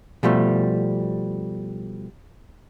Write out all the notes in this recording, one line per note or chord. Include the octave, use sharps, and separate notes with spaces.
B2 F3 G3 A3